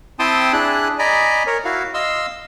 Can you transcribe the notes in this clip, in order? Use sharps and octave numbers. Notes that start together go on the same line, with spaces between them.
C4 E4 G5 A5 C6 D#6
D4 E4 G#4 F#6
D5 D#5 G#5 A#5 B5
A#4 C#5
E4 F#4 F5
D#5 F5 C6 E6